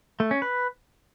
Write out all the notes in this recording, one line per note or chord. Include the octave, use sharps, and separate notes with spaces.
A3
C#4
B4